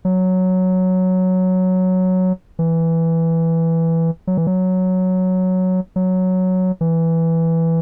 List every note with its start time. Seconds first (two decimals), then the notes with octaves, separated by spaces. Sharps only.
0.05 F#3
2.59 E3
4.27 F#3
4.37 E3
4.47 F#3
5.96 F#3
6.81 E3